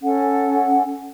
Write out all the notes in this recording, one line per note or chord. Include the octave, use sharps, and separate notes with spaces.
C#4 A4 F#5